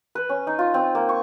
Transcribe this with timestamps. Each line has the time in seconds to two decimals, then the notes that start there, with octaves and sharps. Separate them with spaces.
0.15 B4
0.29 C#4
0.47 D#4
0.59 F4
0.74 C4
0.95 A#3
1.09 C#6